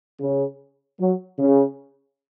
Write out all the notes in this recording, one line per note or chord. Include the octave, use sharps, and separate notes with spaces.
C#3
F#3
C#3